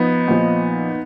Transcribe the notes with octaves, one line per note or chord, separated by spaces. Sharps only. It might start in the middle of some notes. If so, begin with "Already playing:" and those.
Already playing: F3 B3 D#4
A#2 F3